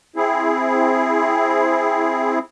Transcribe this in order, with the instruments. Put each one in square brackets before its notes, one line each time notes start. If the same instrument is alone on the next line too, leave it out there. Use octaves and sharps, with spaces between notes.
[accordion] C4 E4 G#4